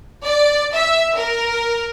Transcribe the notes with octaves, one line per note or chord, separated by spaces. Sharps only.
D5
E5
A#4